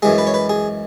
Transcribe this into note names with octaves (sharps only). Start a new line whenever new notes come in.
F#2 E3 G#3 G#4
B4
C#5
B4
G#4